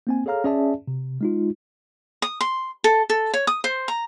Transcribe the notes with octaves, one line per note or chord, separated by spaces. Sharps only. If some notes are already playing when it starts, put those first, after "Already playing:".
A#3 C4 G#5
G#4 A4 C#5 F5 A#5 F6
C#4 G#4 D5 E5 A5
C3
G#3 D#4 F4
D#6
C6
A4
A4
C#5
D#6
C5
A#5